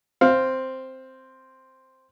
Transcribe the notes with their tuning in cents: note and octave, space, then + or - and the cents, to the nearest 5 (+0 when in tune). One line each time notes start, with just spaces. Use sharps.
C4 +0 F5 +0